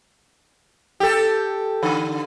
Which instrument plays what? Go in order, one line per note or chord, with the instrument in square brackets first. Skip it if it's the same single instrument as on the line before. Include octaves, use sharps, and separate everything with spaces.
[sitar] G4 A4
D3